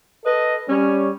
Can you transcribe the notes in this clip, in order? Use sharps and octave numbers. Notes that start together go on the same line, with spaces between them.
A4 B4 D#5
G3 C#4